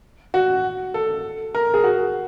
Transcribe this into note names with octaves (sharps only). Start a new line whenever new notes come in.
F#4
A4
A#4
G#4
F#4